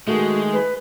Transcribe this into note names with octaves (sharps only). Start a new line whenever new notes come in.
D#3 G#3 A3 F#4 G#4
B4